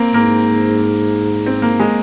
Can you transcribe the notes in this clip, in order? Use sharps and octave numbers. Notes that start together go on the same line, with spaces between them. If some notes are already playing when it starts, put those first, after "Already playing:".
Already playing: A#3 C4
G#2 A#3
C4
A#3
G#3